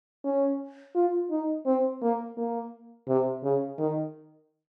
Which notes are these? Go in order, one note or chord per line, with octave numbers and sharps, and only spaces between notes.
C#4
F4
D#4
C4
A#3
A#3
C3
C#3
D#3